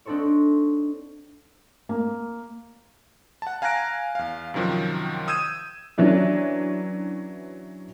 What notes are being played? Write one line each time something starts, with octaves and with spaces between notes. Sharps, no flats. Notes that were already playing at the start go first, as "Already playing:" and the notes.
C4 D4 D#4 A4 C5 C#5
A#3
F#5 A5
F5 G#5 A#5 F#6 A#6 D7
E2 F5
F#2 C3 D#3 F3 F#3
D#6 E6 G6 G#6 D#7 E7
E3 F#3 C#4 D4 E4